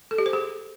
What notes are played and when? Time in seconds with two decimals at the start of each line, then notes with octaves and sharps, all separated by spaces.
0.11 A4
0.18 G4
0.26 C5
0.33 G#4